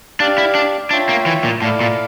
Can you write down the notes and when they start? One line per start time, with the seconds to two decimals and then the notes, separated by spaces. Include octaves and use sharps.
0.20 D4 G4 D5 F5
0.38 E4
0.55 D4
0.91 D4 F4 C#5 E5 G5
1.09 A#3
1.26 E3
1.44 A#2
1.62 A2 E4 A4 D5 F5
1.81 A#2